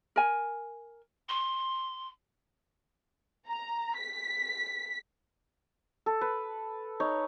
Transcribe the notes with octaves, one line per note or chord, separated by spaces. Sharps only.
A#4 G#5
C6
A#5
B6
A4
B4
D#4 C#5